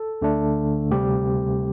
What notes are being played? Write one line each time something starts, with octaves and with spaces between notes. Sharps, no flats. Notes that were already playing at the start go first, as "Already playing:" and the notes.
Already playing: A4
D2 D3 A3 D4
D2 C3 G3 C4 G4